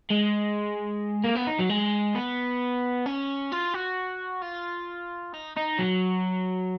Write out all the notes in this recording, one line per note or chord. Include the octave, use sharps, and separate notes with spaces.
G#3
A#3
B3
D#4
F#3
G#3
B3
C#4
F4
F#4
F4
D#4
D#4
F#3